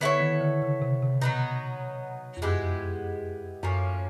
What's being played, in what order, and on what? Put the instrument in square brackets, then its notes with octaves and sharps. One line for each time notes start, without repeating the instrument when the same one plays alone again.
[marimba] D3 [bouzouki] B3 E4 A4 C#5
[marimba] D#3
D3
C#3
C3
C3
[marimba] B2 [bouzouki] F#3 B3 D#4
[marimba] F2
[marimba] F#2 [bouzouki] G#3 B3 E4 G4
[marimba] F#2 [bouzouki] A2 F3 A#3 C#4